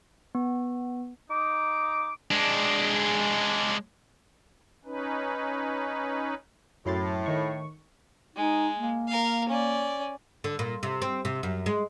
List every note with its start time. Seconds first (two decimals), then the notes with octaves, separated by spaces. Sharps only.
0.35 B3
1.30 D#4 D6
2.31 G#3 D4
4.85 C#4 D#4 B4
6.86 F#2 A2 C6 A6
7.26 D#3 C#6
8.36 G#3 D#4
8.77 A#3
9.08 A#4 F5
9.49 C#4 D5
10.44 D3
10.59 A#2
10.83 C3
11.02 C4
11.25 C3
11.43 F#2
11.66 G#3